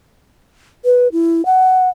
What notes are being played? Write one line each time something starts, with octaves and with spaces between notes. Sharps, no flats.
B4
E4
F#5